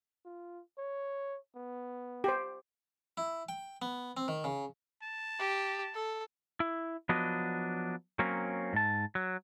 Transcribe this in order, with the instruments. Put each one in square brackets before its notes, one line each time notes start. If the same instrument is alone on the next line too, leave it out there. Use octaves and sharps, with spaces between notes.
[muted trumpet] F4
C#5
B3
[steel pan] G4 C5
[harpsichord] E4
G5
B3
C4
D#3
C#3
[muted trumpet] A5
[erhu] G4
A4
[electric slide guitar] E4
F3 F#3 B3 D4 F#4 D#5
F#3 A#3 C4 C#4
G#2 A5
F#3